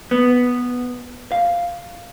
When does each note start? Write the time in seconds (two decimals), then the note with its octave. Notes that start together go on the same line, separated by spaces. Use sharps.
0.11 B3
1.32 F5